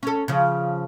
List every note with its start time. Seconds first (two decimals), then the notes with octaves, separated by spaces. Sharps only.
0.03 C#4 A4
0.28 C#3 F3